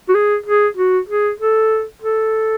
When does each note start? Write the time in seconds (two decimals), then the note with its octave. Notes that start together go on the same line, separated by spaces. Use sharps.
0.09 F#4
0.15 G#4
0.46 G#4
0.77 F#4
1.09 G#4
1.40 A4
2.02 A4